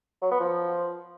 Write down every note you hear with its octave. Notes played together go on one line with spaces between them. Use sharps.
F#3
B3
F3